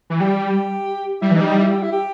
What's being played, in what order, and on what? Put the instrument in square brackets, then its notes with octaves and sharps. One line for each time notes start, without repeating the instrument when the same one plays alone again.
[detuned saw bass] E3
[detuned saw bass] G3 [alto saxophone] G4
[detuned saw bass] G3 [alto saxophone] E4
[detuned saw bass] E3 [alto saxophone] D#4
[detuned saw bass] G3
[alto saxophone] D#4
E4
G4
E4
G4